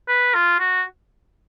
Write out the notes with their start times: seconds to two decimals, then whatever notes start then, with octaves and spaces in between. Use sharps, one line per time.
0.08 B4
0.34 F4
0.60 F#4